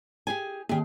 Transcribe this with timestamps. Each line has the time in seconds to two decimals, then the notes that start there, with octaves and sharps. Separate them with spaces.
0.27 G4 G#4 G#5
0.69 D#3 A#3 G4 G#4